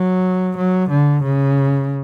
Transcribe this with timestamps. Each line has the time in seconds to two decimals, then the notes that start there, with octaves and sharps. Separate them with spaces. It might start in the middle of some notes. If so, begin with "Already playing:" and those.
Already playing: F#3
0.57 F#3
0.90 D3
1.23 C#3